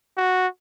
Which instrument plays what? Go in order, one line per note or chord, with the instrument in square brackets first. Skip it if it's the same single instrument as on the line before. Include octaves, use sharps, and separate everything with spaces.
[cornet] F#4